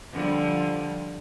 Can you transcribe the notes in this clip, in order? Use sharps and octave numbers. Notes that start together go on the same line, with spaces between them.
D3 F3 G3